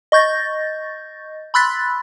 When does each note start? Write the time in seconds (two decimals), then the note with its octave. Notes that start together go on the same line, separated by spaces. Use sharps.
0.12 D#5 C#6 G6 A6 A#6
1.54 B5 C6 E6 F#6 A6 B6